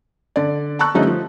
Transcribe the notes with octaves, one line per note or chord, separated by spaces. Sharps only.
D3 D5
A5 A#5 C#6 E6 F#6
D3 F3 G3 A3 C#4 D#4
F3